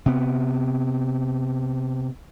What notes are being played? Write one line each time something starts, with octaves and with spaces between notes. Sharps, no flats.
C3 B3